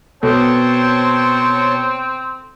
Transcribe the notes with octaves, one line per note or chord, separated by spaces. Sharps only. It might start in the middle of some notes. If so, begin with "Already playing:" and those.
B2 C4 A4 C5 C#5 A5